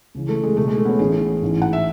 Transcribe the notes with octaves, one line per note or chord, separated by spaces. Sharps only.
C#2 C#3 E3
A3
G#3
C#2 B2 A3
G#3
A3
B3
C#4
A1 A2 E3 G#4
A1 G#2 E3
F#5
E5